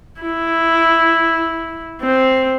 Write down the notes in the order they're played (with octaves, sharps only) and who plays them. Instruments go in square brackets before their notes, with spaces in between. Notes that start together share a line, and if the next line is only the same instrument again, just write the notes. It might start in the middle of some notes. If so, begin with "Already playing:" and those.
[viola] E4
C4